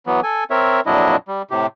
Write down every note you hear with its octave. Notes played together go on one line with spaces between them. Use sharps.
E3 F#3 B3
A4 G#5
C4 A#4 C#5 E5
F2 A#2 F#3 D4 E4 D#5
G3
A2 C3 G4